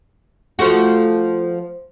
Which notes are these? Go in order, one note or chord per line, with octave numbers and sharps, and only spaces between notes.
F3 A3 F#4